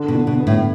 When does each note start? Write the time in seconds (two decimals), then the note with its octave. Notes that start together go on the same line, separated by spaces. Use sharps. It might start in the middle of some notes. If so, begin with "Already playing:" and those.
Already playing: D3
0.08 B2
0.15 D3
0.27 B2
0.40 B3
0.47 A2